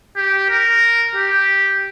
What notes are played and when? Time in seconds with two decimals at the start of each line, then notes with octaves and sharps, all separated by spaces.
0.16 G4
0.50 A#4
1.15 G4